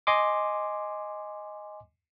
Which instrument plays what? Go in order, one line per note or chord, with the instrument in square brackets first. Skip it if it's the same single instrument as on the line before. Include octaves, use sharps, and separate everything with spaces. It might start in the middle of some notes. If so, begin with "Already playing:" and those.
[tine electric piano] D#5 G#5 C6 D6